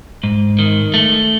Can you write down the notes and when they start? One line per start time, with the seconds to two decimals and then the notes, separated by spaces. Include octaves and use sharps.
0.24 G#2
0.59 D#3
0.94 A3